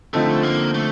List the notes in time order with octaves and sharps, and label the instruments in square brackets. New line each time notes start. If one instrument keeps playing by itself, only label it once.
[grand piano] D3 F3 C4 D#4 A4 [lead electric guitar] A3
[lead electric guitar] A#3
A3